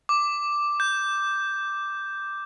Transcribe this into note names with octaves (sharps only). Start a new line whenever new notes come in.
D6
G6